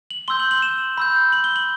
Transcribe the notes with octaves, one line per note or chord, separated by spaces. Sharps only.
F#7
C6 E6 G6 G7
F#7
F#7
E7
B5 E6 G6
F#7
G7
F#7